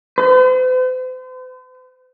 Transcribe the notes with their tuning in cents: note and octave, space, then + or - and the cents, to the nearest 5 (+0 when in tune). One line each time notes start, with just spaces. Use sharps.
C5 -45